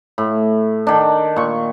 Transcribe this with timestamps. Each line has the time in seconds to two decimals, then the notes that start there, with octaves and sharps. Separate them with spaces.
0.18 A2
0.87 D#3 D4
1.36 A#2 C#6